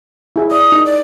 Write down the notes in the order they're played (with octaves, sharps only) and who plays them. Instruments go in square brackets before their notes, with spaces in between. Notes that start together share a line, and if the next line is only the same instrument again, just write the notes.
[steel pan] E4 G#4 E5
[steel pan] D5 [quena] D#6
[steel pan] D#4
[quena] D5